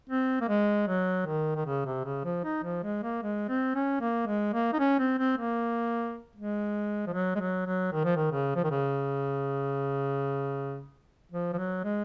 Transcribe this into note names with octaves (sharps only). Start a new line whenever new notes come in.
C4
A#3
G#3
F#3
D#3
D#3
C#3
C3
C#3
F3
D#4
F3
G#3
A#3
G#3
C4
C#4
A#3
G#3
A#3
D#4
C#4
C4
C4
A#3
G#3
F3
F#3
G#3
F#3
F#3
D#3
F3
D#3
C#3
F3
D#3
C#3
F3
F3
F#3
G#3